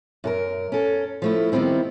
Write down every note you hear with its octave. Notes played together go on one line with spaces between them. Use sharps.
F#2 A4 A#4
C#4 A4
F3 A3 E4
D#3 G3 B3 C4 E4